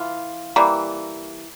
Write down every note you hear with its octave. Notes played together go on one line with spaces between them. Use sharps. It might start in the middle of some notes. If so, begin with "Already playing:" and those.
Already playing: E3 F4
E3 G3 A#3